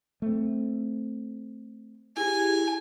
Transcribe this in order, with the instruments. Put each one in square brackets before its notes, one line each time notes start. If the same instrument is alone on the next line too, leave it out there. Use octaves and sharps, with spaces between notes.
[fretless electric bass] A3 C4
[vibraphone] E4 G4 G#4 [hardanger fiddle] G#5